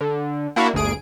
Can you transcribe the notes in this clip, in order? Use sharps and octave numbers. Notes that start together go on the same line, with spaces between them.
D3
A#3 D4 E4 F#4
G1 D2 G#4 D7